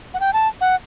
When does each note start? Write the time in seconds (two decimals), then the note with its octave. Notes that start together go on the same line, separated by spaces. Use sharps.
0.14 F#5
0.20 G5
0.33 A5
0.61 F#5